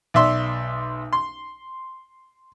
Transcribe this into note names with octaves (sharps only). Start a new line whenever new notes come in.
B1 D5 E5 C6
C6